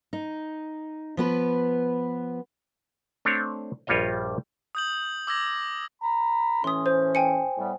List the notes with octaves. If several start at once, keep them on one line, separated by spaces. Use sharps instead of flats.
D#4
F3 B3 B4
A3 C4 D4 C#5
A#1 G2 G3 F4 C#5 D#5
D#6 G6 F#7
D6 E6 G#6 A#6 F#7
A#5 B5
A2 E3 C#4 C6 D#6
C5
G5 G#5 C#7
A2 G3 B3